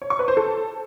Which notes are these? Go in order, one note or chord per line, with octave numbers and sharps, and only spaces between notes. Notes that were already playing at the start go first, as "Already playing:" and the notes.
C#5
C#6
B4
C5
A4